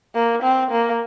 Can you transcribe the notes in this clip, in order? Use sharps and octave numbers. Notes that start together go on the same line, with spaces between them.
A#3
C4
A#3